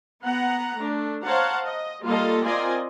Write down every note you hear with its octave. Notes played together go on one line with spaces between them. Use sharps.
B3 F#5 A#5
A3 D4
C5 C#5 F5 F#5 A5 A#5
D#5
G3 A#3 F4 A4 D#5 F5
C4 F4 A#4 D5 D#5 G#5